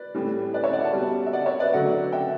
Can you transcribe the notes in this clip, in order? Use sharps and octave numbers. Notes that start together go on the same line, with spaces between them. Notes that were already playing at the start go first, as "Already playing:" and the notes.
Already playing: B4 D5
A2 E3 G3
B4 D5
C#5 E5
D5 F#5
F#5 A5
B2 G3
E5
D5 F#5
C#5 E5
B4 D5
D3 F#3 A3 D5 F#5
E5 G5